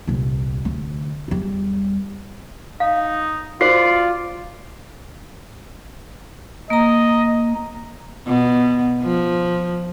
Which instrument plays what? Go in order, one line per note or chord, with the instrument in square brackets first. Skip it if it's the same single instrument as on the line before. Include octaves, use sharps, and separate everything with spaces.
[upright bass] D#1 C2
D2
E2 G3
[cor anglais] D#4 [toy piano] F5
[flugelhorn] F4 [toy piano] F#4 C5 [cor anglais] D5 [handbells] C7
[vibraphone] A#3 A#5 [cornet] D#5
[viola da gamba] B2
F3